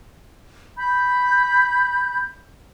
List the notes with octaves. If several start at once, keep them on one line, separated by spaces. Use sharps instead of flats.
B5 G6